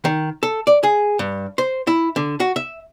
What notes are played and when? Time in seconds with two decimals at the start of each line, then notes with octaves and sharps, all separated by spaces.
0.05 D#3
0.43 A4
0.67 D5
0.83 G#4
1.19 G2
1.58 C5
1.87 E4
2.16 D3
2.40 F#4
2.56 E5